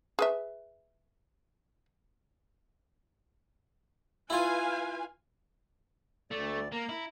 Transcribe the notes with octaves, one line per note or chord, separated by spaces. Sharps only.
G#4 B4 E5
E4 F4 B4 F5 G#5
D2 A3 D5
A#3 A#5
E4